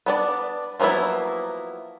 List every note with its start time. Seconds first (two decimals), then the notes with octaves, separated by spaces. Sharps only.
0.06 B3 D4 D5
0.80 F3 F#3 A#3 B3 E4